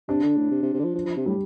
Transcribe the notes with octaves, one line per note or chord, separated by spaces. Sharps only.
C3 D4
D3
A2
C3
C3
C3
D3
F3
F3
F3
C3
A2 G3